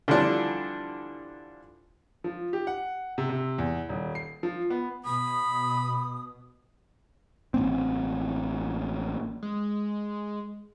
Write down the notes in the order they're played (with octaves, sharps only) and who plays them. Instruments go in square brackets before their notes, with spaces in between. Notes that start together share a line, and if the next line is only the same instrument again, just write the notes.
[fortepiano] D3 E3 F3 G3 D4
[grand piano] F3
G4
F#5
C3
C3
E2
D#1
C7
F3
B3
[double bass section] B2 [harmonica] B5 [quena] D#6
[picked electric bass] A1 A#3 C4
[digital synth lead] G#3